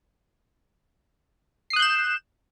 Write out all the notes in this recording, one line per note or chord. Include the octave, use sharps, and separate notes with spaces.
D#6 F#6 G6 C7 E7